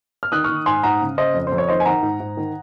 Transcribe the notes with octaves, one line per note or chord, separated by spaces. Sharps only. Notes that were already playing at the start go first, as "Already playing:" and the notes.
F6
D#3 D#6 F#6
D#3 C#6 F6
G#2 G#5 C6
G#2 F#5 A#5
C#3
C#3 C5 D#5
F2
C5
F2
C#5
D#3 C5 D#5
G#5
D#3 F#5 A#5
G#2
G#2
D#3